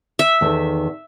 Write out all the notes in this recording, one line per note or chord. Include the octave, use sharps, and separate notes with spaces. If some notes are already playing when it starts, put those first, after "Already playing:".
E5
E2 D#3 A4